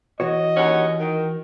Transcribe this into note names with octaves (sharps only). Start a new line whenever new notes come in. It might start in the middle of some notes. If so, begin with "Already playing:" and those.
E3 F#4 C#5 D#5
D#2 C#4 F#5
D#3